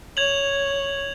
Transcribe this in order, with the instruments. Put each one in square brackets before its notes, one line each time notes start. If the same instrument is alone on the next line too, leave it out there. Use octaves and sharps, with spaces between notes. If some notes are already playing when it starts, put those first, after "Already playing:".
[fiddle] C#5 [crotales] G#6 F7 F#7